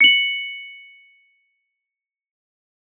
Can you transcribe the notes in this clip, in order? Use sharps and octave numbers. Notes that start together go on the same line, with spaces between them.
C#7 F#7